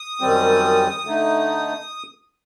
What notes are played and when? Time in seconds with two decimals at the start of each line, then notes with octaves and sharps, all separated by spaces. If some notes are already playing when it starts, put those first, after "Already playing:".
Already playing: D#6
0.21 F#2 D#3 G3 C4
1.05 D3 A3 D#4